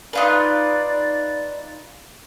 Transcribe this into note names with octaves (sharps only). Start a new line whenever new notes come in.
D#4 F4 B4 D5